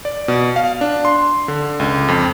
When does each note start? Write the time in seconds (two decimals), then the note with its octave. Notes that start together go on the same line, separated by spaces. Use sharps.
0.05 D5
0.28 B2
0.56 F5
0.81 D4
1.05 C6
1.48 D3
1.80 C#2
2.08 F2